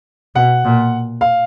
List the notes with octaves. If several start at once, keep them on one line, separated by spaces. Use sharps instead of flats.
B2 F#5
A#2
F5